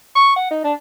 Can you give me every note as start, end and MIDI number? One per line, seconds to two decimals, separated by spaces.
0.16 0.36 85
0.36 0.46 78
0.51 0.59 63
0.64 0.73 62